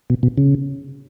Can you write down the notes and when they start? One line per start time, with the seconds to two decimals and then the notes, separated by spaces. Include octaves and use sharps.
0.10 B2
0.23 B2
0.38 C#3